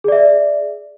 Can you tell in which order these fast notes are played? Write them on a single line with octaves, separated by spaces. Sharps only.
G#4 D5 E5